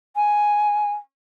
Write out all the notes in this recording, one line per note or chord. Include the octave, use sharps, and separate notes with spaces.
G#5